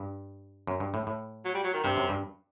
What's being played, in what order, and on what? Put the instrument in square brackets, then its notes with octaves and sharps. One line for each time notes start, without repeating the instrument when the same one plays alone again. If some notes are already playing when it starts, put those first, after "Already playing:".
Already playing: [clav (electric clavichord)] G2
F#2
G2
A2
A2
[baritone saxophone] F#3
G3
F#3
D#3
[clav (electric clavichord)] G2 [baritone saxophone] C3
[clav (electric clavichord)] F#2
G2